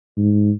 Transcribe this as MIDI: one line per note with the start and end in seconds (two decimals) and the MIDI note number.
0.17 0.51 44